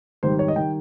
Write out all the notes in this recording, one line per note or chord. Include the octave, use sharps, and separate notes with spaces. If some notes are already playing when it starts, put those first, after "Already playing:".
G#1 G#2 D#3 G3 C5
C#5
D#5
D#3 G3 G5